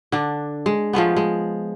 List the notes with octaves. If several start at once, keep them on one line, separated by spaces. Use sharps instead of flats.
D3 D4
G#3
F3 G#3 A3 B3
G#3